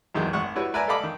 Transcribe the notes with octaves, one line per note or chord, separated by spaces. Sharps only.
G#1 E2 D#3 F#3 G#3
G#1 F#5 C#6
G3 E4 F#4 B4 C#5
A#4 B4 D5 E5 G#5 A#5
A4 D5 D#5 F5 B5 D6
D#3